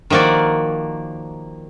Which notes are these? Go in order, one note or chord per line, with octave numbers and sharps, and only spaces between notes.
D#3 F3 A#3 F#4 D5